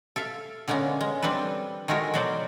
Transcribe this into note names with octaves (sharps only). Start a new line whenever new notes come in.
A4 E5 F5
D3 G#3 A#3 B3 C#4
G#3
G3 C4 D4 A4 B4
D#3 G#3 A3 F#4 A#4 C#5
B2 F#3 F#4 C5 D5